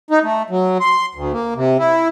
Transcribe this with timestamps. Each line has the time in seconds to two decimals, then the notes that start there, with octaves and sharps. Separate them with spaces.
0.11 D#4
0.23 A3
0.50 F#3
0.80 C6
1.15 D2
1.33 A#3
1.56 C3
1.79 E4